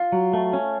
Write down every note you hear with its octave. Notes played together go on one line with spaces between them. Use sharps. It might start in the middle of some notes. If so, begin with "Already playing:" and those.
Already playing: F4
F#3
A3
C#4